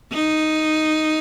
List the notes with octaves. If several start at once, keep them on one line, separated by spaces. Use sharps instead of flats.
D#4